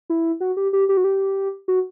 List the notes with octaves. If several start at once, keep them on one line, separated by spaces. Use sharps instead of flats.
E4
F#4
G4
G4
G4
F#4
G4
F#4